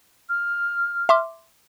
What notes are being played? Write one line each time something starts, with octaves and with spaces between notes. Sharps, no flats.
F6
E5 C6 D6